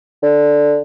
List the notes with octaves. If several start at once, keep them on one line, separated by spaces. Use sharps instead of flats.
D3